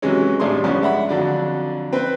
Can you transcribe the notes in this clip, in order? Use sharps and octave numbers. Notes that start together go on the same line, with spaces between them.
C3 E3 F#3 G#3 C#4
A1 G3 A3 D4 G#4 C6
G2 C#3 F3 G3 B3 C#4
G#3 D4 E5 F#5 B5
F2 D3 F#3 D5
C4 B4 C5